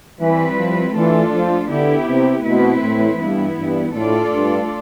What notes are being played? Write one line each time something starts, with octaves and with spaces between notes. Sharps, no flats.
E3 G3 C4 E4 B4
F3
E3 A3 D4 F4 A4
F3
D3 B3 E4 G4
C3
B2 E3 A3 C4 E4 B4
A2
G2 E3 B3 E4
G2
A2 A3 D4 F4 A4 D5
G2